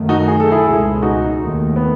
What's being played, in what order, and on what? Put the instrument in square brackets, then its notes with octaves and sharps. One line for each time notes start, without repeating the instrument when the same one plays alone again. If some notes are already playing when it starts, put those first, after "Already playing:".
Already playing: [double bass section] F#2 D#3 F#3 A3
[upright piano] D#4 F#4
G#4
A4
E4 G#4
[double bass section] C#2 B2 G#3
[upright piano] D#4 F#4
[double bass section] D#2 D#3 A3
[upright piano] B3